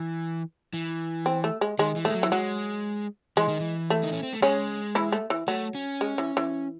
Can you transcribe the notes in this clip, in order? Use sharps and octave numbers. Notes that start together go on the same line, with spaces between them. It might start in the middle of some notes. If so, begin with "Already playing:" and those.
Already playing: E3
E3
C4
A3
G#3
D#3 G#3
E3
G#3 A3
F#3
E3
F#3 G#3
E3 G#3
D#3
E3
A3
D#4
C#4
C4
A3
C#3 G#3 C#4
E3 E4
A3
E3
F#3 A3
C#4
G#3
E3
E3